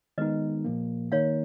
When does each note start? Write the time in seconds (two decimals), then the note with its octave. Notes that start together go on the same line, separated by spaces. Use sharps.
0.18 D#3 G#3 B3 D#4 B4 D#5
0.65 A#2 F3 A#3
1.12 D#3 A#3 D#4 C#5 F5